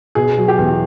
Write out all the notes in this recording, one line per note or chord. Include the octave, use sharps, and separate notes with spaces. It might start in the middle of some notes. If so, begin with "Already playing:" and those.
B2 G#4
F#3
G4
E2